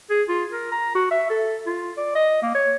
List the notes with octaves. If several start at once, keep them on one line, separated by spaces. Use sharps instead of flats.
G#4
F4
A#4
A#5
F#4
E5
A4
F4
D5
D#5
A#3
C#5